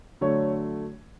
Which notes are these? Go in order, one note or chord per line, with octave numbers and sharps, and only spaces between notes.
D3 F#3 A3 C#5